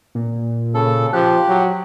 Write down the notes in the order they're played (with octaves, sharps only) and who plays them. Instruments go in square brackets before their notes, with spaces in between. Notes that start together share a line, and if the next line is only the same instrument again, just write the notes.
[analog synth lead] A#2
[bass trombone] C#3 [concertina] A4
[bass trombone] F3 [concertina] G4 [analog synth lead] F#6
[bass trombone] F#3